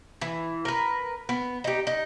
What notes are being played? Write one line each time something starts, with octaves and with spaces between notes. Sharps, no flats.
E3
A#4 B4
B3
D#4 G4
D#4